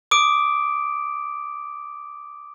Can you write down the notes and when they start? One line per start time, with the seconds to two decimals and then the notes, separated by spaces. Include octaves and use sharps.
0.11 D6 D#6 D7